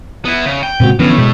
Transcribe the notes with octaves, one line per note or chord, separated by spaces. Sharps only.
B3 E4
C#3
G5
A#2 C#3 G#3 C4 F#4
A2 D3 E3 F3 G3 B3 C#4
B2 G#3